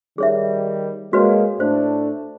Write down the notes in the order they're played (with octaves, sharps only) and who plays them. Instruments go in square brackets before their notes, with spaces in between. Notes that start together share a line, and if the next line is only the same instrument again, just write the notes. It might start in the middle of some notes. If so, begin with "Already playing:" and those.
[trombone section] D#3 G3 [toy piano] G#4 C#5 E5
[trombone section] G#3 A#3 [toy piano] F#4 B4 C#5
[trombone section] A2 A3 D4 [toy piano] C5